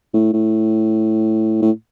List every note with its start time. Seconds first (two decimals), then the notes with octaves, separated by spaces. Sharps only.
0.14 A2
0.33 A2
1.62 A2